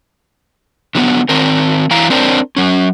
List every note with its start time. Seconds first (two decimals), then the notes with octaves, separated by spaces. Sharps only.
0.95 D3 F#3 A#3 B3
1.29 D#3 C4 A#4
1.91 E3 E4 F5 A#5
2.10 C4 D4 A#4 C5
2.56 F#3 C#4